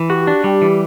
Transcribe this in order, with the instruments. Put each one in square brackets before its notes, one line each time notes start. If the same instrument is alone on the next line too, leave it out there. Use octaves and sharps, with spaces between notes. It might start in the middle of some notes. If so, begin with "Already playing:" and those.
Already playing: [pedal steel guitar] E3
[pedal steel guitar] F#4 [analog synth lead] G4
[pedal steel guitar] D4
[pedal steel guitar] G3 [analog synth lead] G4
[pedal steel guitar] E3